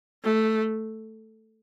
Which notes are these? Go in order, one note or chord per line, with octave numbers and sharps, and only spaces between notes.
A3